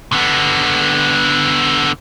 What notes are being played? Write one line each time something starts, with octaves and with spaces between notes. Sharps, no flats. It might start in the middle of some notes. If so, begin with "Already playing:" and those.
D3 B3